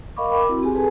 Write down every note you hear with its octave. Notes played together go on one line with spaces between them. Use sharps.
A#4 D#5 F5 B5 C#6 D6
A#4 G5 B5 D6
C4 E4 F#4
C4 G4 G#4 G#5
G#4 A4 B4 G#5 A5